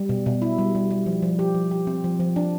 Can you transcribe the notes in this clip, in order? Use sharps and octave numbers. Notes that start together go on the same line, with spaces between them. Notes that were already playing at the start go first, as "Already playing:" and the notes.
Already playing: G3
B2
B2
E4
G3
G3
G3
F3
F3
G4
F3
G4
C4
F3
F3
D4